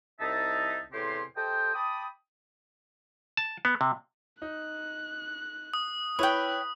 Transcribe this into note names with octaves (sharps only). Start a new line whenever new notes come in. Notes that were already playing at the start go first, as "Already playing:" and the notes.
C2 D#4 E5 A5
E2 A2 C3 G4 G#5 C6
G4 A4 C5 D#5 G5
G5 A5 B5 D6 D#6
A5
B3
C3
D#4 F#6
D#6
E4 B4 C#5 G5 B5 F#6